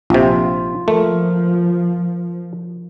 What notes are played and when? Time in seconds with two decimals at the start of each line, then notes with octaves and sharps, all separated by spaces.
0.10 A#1 C3 F4
0.88 F3 A3 A#4